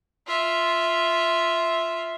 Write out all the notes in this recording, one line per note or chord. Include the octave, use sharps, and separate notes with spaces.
F4 E5